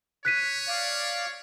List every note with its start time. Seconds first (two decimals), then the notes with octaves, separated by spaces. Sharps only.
0.25 C#5 F#6 B6 D#7
0.68 D5 F5